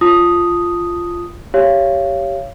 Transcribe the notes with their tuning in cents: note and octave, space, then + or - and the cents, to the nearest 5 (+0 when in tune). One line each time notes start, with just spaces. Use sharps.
F4 -10 A5 +5 D#6 +0
G4 +0 C#5 +0 F5 -30